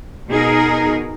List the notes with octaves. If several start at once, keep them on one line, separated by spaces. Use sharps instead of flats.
B2 D#4 G#4 A#4